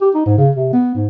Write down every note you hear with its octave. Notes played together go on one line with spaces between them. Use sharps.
G4
D#4
G#2
C#3
C3
B3
G#2